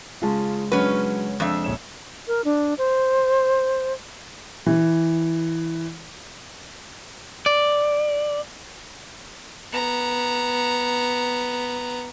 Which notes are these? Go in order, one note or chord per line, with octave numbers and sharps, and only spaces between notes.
C#3 G#3 C#4 F4 G#4 A5
F#3 G#3 C#4 D4 B4 F#5 F6
F2 D4 E5
A#1 C#5 E7
A#4
D4
C5
E3
D5
B3 A#5